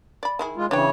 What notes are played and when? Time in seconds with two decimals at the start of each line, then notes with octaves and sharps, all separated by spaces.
0.23 D5 B5
0.39 D#3 E4 G#4
0.57 G#3 F4
0.71 C#3 E3 D4 B4 C#5 G5